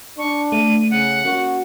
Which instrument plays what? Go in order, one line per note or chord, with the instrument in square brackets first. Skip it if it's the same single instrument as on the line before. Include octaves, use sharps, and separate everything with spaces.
[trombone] D4 [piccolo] C#6
[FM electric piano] A3 [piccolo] D#7
[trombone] C#3 [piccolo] F#5
[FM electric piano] A#3 C#4 [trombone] F#4